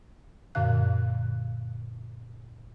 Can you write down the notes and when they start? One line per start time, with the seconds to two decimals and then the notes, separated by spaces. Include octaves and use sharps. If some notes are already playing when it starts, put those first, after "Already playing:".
0.55 F#2 A#2 D3 F5 F#6